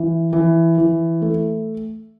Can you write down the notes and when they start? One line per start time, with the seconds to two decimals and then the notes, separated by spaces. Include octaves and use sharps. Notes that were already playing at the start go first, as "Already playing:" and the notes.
Already playing: E3
0.33 E3
0.78 E3
1.22 A3